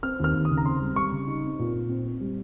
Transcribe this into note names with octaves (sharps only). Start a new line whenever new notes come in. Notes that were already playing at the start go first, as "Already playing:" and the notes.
C4 F6
D#2 F6
D#2
D#6
C#3
A#5
C4 C6
G3
G3 C#6
C#3
D#4
C4
A#2
A#2
C4
C4
G3